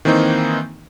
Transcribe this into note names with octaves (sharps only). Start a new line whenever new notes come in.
D#3 E3 A#3 C4 D#4